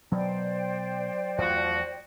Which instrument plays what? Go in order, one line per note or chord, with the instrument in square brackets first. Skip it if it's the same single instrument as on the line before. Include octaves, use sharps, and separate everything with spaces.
[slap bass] B2 [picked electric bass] F#3 [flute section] C5 D5 G5
[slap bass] E2 A3 [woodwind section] F3 F#4